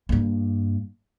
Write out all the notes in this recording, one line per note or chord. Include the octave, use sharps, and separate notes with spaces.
G2 A#3